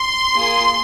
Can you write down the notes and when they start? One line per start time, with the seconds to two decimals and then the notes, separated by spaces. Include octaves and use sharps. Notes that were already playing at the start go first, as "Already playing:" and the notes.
Already playing: C6
0.33 A#3 F4 G#4